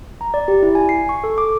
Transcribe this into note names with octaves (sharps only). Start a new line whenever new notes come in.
A#5
D5
G4
E4
G#5
C7
C#6
A4
D6